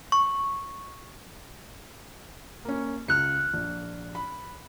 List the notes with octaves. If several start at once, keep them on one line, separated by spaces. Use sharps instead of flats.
C#6
A#3 C#4
C#2 F6 F#6 C#7
A#1
B5